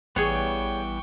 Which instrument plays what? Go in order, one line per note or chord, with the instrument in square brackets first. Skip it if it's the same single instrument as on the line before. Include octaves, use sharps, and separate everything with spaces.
[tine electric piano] A1 [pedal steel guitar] E3 G3 B3 [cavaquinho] G#4 C#5 [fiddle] G5 C#6